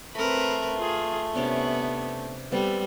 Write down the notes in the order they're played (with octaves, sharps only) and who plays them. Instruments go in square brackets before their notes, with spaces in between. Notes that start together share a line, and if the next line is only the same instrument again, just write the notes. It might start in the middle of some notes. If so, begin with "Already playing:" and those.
[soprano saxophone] A3 [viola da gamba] C4 A#4 B4 [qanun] B5
[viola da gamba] F4 G#4
[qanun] C3 C#4 D4 [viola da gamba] B3
[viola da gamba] G3 [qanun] B3 C4 A4